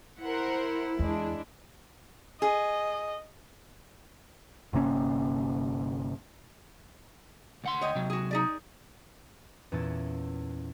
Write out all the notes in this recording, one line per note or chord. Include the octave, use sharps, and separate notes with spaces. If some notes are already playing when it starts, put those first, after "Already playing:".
E4 A#4 C5 F#5
E2 G#3 D4
G#4 D#5
G1 C3 A#3 C#4
D2 F#5 C6
C#5 D#5 G5
C3 F#3
F#4 G#4
D#4 G#4 D5
E2 A#2 C#4 A5 A6